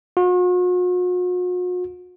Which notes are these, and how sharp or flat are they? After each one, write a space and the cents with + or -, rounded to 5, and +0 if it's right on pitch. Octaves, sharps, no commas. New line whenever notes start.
F#4 -45